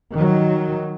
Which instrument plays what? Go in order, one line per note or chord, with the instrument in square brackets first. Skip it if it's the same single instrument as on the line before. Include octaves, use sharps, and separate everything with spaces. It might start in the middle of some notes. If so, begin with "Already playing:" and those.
[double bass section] D#3 F#3